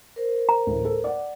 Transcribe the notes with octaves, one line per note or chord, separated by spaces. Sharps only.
A#4 C5
A#5
A1 D2
A4
D5 F#5